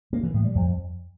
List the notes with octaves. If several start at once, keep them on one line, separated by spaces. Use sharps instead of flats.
A#3
E3
A2
G3
F2